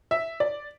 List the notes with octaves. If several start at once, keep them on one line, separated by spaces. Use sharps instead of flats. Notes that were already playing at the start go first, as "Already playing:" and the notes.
E5
D5